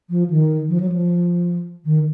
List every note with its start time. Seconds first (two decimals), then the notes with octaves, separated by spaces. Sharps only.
0.10 F3
0.30 D#3
0.69 F3
0.80 F#3
0.92 F3
1.85 D#3